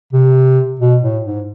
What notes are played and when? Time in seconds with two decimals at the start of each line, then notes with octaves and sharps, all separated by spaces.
0.13 C3
0.80 B2
1.03 A2
1.25 G#2